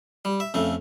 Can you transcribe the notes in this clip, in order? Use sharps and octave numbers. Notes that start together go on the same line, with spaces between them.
G3
E5
F2 C#3 A3